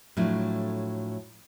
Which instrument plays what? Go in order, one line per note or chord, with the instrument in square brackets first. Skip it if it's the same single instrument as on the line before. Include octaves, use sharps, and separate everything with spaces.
[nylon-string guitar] A2 F3 F#3 D4